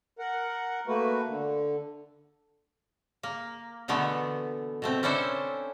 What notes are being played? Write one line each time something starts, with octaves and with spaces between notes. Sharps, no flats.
A#4 F#5
A3 A#3 F#4 B4
D3
A#3
B2 D3 E3 A3 B3
B2 A3 C4
C#4 D4 E4 A4 C5